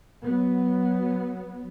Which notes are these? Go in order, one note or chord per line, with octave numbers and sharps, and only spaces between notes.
F#3 B3